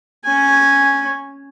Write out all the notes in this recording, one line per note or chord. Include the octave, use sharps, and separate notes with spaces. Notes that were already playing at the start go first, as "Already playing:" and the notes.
C#4 G#5